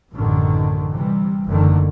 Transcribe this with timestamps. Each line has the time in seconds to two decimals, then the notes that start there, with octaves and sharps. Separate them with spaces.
0.12 A1 F#2 D3 D#3
0.91 C3 E3 G3
1.45 F#1 E2 D3 D#3 A3